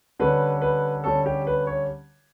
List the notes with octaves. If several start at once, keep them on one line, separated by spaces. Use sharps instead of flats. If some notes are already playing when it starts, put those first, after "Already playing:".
D3 G3 C#4 B4
B4
D3 G3 C#4 A4
G4
B4
C#5